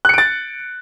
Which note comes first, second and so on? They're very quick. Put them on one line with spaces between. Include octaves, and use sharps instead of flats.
F#6 C#7 D7 A6